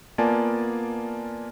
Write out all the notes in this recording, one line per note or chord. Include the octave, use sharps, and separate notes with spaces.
A#3 B3 F4 D5 G#5 A5